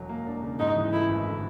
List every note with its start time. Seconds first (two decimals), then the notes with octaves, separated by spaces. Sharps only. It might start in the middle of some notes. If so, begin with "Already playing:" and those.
Already playing: E1 F#3
0.09 A#3
0.27 D4
0.42 C#3
0.60 G#2 D#4
0.76 E3
0.92 A3 E4
1.08 G#1
1.26 D3